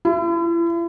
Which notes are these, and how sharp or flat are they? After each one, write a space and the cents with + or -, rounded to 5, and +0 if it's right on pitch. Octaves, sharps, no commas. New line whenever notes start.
E4 +40